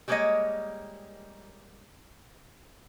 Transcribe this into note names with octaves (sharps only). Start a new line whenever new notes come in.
G3 G#3 A#3 C5 C#5 D#5